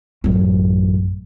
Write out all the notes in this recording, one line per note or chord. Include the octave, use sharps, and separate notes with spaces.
A1 F#2